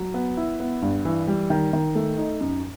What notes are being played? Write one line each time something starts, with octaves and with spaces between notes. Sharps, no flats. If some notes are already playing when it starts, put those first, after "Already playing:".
Already playing: F#3
B3
E4
B3
G2
E3
G3
D#3
D#3
A3
D#4
F#2